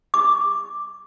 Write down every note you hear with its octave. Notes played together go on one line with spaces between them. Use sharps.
D6